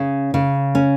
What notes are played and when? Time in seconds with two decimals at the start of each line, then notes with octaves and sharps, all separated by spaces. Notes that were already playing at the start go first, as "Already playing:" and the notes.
Already playing: C#3 C#4
0.34 C#3
0.75 C#4